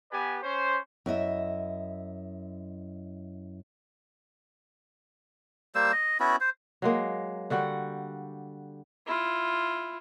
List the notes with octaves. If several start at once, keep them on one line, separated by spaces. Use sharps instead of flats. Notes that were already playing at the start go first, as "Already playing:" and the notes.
B3 G4 B4 D5 G#5
C#4 C5
F#2 E4 D#5 E5
G3 A#3 C5 E6
D#5
B3 C#4 E4 F#4
C5
F#3 G#3 A#3
D3 G3 F#4 F#5
E4 F4